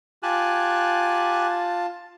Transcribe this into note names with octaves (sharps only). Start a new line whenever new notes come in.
F4 G4 G#5 A5 F#6